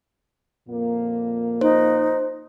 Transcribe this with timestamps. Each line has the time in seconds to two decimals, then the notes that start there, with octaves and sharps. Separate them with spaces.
0.69 F2 A#2 A#3
1.61 D#4 C5